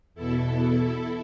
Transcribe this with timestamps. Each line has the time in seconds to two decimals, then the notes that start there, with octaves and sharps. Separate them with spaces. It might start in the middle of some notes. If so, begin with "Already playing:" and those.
0.15 E2 B2 E4 A4